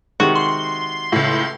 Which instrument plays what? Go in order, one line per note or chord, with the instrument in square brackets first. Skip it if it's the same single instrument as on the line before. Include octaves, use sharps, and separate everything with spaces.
[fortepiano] C3 D#3 G#3 [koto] F#4
[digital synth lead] C6
[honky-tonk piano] C#2 A2